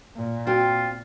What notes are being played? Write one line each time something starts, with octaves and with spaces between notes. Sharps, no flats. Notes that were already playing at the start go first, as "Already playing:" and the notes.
A#2
C4 F4 F#4 G5